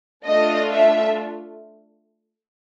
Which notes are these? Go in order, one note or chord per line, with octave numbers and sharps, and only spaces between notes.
A3 D4 F4 A4 D#5
E5